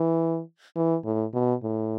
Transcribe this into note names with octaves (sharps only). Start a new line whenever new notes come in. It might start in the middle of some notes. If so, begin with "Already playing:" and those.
Already playing: E3
E3
A2
B2
A2